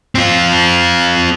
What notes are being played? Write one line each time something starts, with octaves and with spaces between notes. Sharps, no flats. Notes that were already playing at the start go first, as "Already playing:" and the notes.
C4 F4